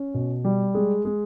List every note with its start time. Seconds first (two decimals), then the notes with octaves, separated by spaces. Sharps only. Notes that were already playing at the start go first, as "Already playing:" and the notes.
Already playing: C#4
0.14 B2
0.44 G3
0.74 G#3
1.05 G#3